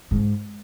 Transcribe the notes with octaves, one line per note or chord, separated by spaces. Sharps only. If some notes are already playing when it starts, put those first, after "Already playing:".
G#2